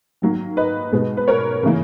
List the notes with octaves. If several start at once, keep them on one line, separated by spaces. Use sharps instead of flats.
D#3 F#3 A#3
B4 D#5
B2 G#3 B3
B4
A#4 C#5
C#3 E3 A#3